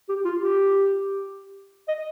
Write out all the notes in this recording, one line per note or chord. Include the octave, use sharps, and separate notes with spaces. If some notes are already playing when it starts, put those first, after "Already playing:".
G4
F4
G4
D#5